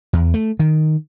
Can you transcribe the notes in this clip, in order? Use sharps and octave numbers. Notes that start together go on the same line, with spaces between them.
E2
A3
D#3